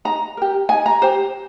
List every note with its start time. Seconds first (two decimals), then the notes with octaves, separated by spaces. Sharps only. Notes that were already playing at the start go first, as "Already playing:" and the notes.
0.05 D#4 A#5
0.37 G4 A#4
0.69 D#4 G#5
0.86 A#5
1.02 G4 A#4 C5